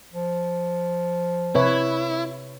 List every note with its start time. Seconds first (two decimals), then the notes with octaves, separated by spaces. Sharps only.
0.14 F3
1.55 C3 E4 B4 C#5